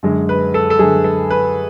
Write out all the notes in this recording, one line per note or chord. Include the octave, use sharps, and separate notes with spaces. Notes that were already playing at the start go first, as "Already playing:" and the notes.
F#2 D3 G#3
B4
A4
A4
F#2 D3 G#3 G#4
A4
B4